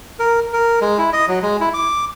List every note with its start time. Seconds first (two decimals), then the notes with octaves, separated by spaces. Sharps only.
0.19 A#4
0.53 A#4
0.81 G#3
0.98 E4
1.13 D#5
1.28 F#3
1.42 G#3
1.61 E4
1.74 D6